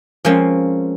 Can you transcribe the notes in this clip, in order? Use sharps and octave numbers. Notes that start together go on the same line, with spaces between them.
F3 G#3 A#3 C4 C#4